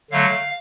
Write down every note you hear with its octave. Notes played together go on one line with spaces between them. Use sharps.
D3 F#3 A3 F5